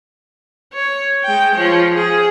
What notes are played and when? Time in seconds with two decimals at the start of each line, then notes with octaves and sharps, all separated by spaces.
0.73 C#5
1.23 G#3 G5
1.55 F3 C#5
1.93 G#4